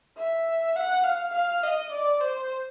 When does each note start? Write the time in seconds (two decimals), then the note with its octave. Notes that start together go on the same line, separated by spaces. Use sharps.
0.17 E5
0.76 F#5
1.04 F5
1.33 F5
1.63 D#5
1.91 D5
2.20 C5